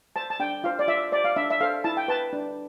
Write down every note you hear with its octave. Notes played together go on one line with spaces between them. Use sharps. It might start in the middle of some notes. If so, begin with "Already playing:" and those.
C5 A5
A5
D4 G5
F4 C5 F5
D5
F4 E5
C5 D5
F5
D4 E5
E5
A4 C5 F5
E4 A5
G5
B4 A5
D4